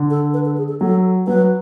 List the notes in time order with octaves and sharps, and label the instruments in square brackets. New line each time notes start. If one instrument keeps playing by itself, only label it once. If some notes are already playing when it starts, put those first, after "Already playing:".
Already playing: [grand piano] D3
[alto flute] A4
B4
A4
G#4
A4
[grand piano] F#3 [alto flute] A4
[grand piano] F#3 [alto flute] B4